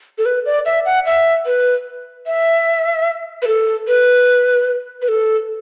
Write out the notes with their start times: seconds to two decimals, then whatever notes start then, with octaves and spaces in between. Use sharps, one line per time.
0.18 A4
0.26 B4
0.46 D5
0.66 E5
0.86 F#5
1.06 E5
1.46 B4
2.26 E5
3.42 B4
3.47 A4
3.88 B4
5.02 B4
5.08 A4